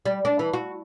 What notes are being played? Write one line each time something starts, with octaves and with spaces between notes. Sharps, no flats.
G3
D4
E3
F#4